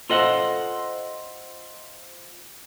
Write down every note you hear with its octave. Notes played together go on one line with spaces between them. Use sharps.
F4 A4 C5 D#5 E5 F#5